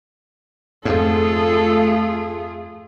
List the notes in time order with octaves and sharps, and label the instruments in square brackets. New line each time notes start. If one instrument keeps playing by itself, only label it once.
[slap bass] F2 G#2 [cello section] A3 F4 G#4 [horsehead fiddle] A4